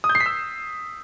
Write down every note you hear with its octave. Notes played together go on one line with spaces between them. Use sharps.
D#6
G6
C7
B6
E6